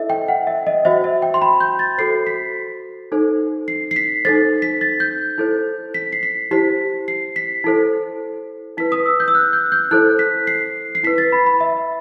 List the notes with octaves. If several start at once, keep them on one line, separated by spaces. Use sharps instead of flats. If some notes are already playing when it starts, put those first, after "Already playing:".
Already playing: E4 A4 C5 D#5 E5
G5
F#5
E5
D#5
F#4 C5 E5
E5
G5
C6
B5
G6
A6
F#4 A4 C5 C7
B6
D#4 A4 C5
C7
C7
B6
D#4 A4 C5 A6
B6
A6
G6
E4 A4 C5
B6
C7
B6
E4 G4 C5 B6
C7
B6
E4 A4 C5
E4 B4 B6
D#6
E6
G6
E6
F#6
G6
G6
E4 A4 C5 F#6
B6
C7
C7
E4 B4 B6
A6
B5
B5
E5